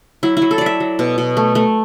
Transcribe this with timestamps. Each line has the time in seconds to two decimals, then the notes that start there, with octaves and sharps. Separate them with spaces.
0.23 F#3 E4
0.37 E4
0.42 F#3
0.51 A4
0.58 F#3 D5
0.66 E5
0.80 F#3
0.99 B2
1.18 B2
1.37 A3
1.55 A3